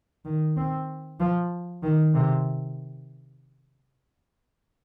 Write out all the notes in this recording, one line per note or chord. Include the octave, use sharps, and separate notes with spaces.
D#3
C4
F3
D#3
C3